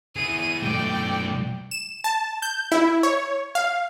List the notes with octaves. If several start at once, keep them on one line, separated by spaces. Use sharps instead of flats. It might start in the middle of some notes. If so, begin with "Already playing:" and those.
E4 G#4 D#7
B1 A3 D5 G5
E7
A5
G6
E4
C#5
F5